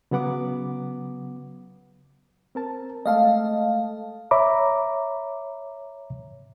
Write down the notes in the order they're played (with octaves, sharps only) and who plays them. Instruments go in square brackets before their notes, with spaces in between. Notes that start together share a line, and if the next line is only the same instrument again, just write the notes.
[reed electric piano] C#3 F#3 B3 F#5 D6
C4 A#4 A5
[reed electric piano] G#3 A3 A4 [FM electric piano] D#5 F5 A5
[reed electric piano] C#5 E5 A#5 B5 D6